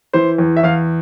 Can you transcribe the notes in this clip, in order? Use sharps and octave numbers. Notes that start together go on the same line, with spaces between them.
E3 C5
E2
E5
E2 F5